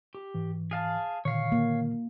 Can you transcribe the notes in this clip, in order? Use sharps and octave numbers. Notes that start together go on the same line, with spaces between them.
G4
G#2 E3
G#4 F5 A5
A#2 D3 D#3 C#5 F5
A#3